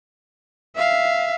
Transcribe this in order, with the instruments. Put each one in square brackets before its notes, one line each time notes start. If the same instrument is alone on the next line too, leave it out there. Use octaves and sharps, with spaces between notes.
[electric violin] E5 F5